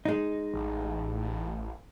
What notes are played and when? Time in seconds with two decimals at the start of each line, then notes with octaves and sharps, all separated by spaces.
0.05 G#3 D#4
0.53 A1